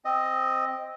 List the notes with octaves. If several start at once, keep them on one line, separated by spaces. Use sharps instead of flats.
C4 D#5